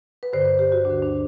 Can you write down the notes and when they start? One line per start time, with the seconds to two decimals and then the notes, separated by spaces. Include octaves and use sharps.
0.23 B4
0.33 G2 D3 C5
0.45 B4
0.59 G4
0.72 F#4
0.85 D2 D3 D4
1.02 D4